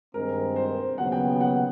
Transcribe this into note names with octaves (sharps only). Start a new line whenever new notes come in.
G2 D#3 G#3 C4 A#4
C5
D#2 C#3 F#3 B3 F#5
G5
F#5